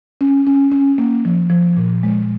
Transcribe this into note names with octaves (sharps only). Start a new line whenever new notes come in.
C#4
C#4
C#4
A#3
F3
F3
A#2
G#3